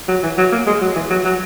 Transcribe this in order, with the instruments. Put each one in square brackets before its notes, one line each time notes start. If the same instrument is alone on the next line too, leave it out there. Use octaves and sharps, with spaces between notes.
[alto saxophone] F#3
E3
F#3
A#3
G#3
F#3
E3
F#3
F#3